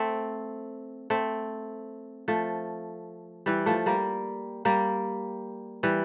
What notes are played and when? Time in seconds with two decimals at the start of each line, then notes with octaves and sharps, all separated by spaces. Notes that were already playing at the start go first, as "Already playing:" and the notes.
Already playing: A3 C4
1.10 A3 C4
2.28 F3 A3
3.46 E3 G3
3.66 F3 A3
3.86 G3 A#3
4.65 G3 A#3
5.83 E3 G3